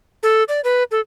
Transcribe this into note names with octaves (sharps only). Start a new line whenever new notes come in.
A4
D5
B4
A4